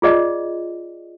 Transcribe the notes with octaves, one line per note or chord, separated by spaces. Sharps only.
F4 G#4 D5 D#5